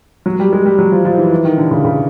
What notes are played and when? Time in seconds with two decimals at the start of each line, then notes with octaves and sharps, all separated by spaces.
0.26 F#3
0.39 G3
0.53 G#3
0.66 G3
0.79 F#3
0.92 F3
1.05 F3
1.18 E3
1.31 E3
1.45 D#3
1.58 D3
1.71 C#3
1.85 C#3